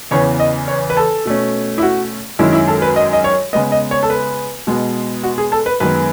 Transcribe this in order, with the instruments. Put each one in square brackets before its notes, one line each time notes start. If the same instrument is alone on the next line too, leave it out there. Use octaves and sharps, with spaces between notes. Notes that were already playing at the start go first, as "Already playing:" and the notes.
[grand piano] E2 C#3 E3 B3 C#5
D#5
C#5
B4
A4
B2 A3 C#4
E4
F#4
F#2 D#3 G#3 C#4 E4
E4
A4
B4
D#5
D#5
C#5
C#3 G#3 B3 D#5
D#5
C#5
A4
B4
B2 G#3 B3
F#4
G#4
A4
B4
F#2 D#3 G#3 B3 B4